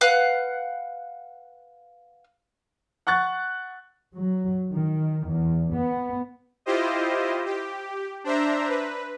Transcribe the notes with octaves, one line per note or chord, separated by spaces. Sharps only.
B4 F5 F#5
F#5 C#6 F#6 A6
F#3
D#3
E2
B3
E4 F4 G4 C5 D#5
G4
D4 C5 E5 A#5
B4